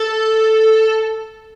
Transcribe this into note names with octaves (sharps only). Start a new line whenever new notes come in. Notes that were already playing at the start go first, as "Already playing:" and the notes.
Already playing: A4